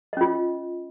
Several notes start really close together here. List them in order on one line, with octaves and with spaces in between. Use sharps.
D#5 C#4 F4